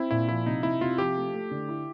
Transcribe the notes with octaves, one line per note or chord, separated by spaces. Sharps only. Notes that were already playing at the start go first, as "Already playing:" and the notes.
Already playing: C4 E4
A#2 E4
F3 E4
C3 D#4
C3 E4
C3 F4
F3 G4
A3
A3
D3
E4